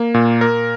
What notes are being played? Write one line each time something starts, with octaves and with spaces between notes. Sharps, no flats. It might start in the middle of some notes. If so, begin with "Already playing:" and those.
Already playing: A#3
A#2
A#4